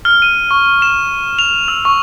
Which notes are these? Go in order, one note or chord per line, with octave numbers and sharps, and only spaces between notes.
F6
D#7
C#6
E7
F7
E6
C#6